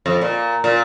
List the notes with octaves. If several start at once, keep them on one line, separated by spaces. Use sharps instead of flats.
F2
A#2
A#2